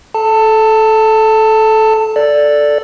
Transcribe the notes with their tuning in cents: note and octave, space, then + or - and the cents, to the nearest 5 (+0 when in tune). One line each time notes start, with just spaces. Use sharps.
A4 -20 A5 +20
A4 +0 D5 +0